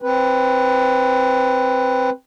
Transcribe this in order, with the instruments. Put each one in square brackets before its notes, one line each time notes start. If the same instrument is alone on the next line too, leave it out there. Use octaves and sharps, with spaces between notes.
[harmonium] C4 B4